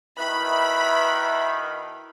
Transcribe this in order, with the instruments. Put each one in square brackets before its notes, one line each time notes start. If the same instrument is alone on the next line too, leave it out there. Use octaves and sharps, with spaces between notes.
[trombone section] B2 D#3 [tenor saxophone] E4 [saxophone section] B4 E5 [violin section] B5